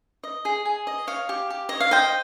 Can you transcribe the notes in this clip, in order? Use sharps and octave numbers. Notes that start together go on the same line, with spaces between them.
D#5
G#4
G#4
D#5
C#5 F5
G4
G4
C#5 D#5
F5
C5 D#5 G5